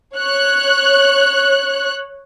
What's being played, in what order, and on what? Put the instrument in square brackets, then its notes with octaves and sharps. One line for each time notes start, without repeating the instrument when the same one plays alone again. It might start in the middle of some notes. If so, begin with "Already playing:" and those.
[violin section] C#5 F#6